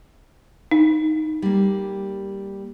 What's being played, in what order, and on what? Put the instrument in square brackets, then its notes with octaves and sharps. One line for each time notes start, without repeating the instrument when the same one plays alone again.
[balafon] D#4
[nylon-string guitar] G3 A#3